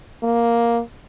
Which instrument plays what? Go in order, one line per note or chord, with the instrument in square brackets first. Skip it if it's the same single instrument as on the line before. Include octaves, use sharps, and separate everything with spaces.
[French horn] A#3